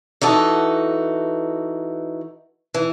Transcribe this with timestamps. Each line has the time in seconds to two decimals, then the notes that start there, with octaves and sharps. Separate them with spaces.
0.21 E3 D#4 F#4 A4
2.74 E3